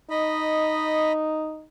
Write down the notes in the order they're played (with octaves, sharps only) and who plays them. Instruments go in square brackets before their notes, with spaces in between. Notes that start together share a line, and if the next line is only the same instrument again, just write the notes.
[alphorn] D#4 [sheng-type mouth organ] D#5 B5